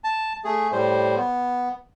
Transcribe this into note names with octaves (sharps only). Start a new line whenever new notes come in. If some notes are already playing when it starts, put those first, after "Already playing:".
A5
A3 G#4
A2 G3 C5
B3